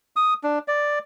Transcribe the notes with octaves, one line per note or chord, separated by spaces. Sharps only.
D#6
D4
D5